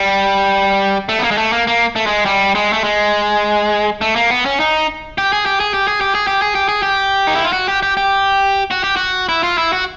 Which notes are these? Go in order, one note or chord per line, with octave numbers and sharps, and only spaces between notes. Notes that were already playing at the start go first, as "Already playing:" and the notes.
Already playing: G3
A3
B3
A#3
G#3
A3
A#3
A#3
A3
G#3
G3
G#3
A3
G#3
A3
A#3
B3
C#4
D#4
G4
G#4
G4
G#4
G4
G#4
G4
G#4
G4
G#4
G4
G#4
G4
D#4
E4
F4
F#4
G4
G4
G4
F#4
G4
F#4
E4
F4
E4
F#4